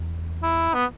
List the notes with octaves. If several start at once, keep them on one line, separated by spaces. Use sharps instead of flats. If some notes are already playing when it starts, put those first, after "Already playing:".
Already playing: E2
E4
B3